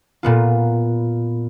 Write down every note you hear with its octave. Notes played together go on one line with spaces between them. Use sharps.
A#2 B3 F4